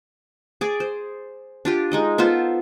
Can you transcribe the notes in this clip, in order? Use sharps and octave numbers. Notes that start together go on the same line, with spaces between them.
G#4 D5
C5
D4 F4 G4
G#3 D#4 D#5
B3 F4 A4 C5